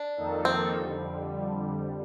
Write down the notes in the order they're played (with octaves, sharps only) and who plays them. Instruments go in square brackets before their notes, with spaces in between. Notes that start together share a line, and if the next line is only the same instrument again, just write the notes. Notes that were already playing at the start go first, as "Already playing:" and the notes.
Already playing: [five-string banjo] D4
[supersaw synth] F2 D#3 A#3 D#4 A4
[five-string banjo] C4
[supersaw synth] F2 D3 G3